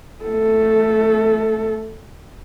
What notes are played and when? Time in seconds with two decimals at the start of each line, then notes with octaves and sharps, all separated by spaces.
0.24 A3 A4